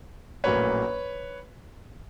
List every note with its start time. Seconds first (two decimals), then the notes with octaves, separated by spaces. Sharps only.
0.44 A#1 A2 F#3 A#3 C#4 B4 C#5